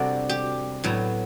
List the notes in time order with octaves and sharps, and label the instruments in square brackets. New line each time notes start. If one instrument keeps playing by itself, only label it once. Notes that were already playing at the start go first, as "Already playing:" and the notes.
Already playing: [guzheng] C3 G3 D4 F#4 A4
G4
A2 F#3 B3